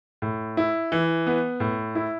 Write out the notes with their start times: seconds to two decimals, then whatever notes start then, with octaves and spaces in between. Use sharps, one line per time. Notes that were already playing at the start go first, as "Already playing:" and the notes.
0.22 A2
0.57 E4
0.92 E3
1.27 B3
1.60 A2
1.95 E4